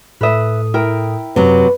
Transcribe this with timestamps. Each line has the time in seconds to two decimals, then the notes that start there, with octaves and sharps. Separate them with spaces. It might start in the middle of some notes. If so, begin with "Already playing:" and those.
0.21 A2 A4 B4 E5 D#6
0.74 E4 A#4 G5
1.36 F#2 C3 F#3 B4